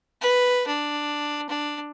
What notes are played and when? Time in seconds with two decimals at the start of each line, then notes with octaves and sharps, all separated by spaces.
0.22 B4
0.67 D4
1.49 D4